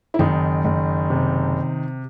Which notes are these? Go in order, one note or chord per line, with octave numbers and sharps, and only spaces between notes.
E4
F#1 D#3 D#4
F#1
C3